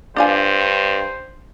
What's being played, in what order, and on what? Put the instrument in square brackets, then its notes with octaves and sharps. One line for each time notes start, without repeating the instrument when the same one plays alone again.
[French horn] G2 [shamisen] D4 F4 G#5 [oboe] C5